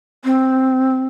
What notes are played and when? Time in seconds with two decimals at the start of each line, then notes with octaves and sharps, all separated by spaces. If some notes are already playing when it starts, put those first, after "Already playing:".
0.25 C4